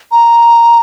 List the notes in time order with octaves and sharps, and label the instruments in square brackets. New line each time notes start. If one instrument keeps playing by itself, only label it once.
[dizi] A#5